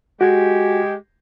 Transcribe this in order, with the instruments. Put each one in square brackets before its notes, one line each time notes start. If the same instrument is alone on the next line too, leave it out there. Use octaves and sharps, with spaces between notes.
[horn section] G#3 G4 [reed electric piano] F#4